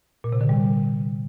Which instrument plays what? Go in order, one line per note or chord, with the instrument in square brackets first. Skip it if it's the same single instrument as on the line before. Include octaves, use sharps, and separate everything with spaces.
[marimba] A#2
C3
D3
G3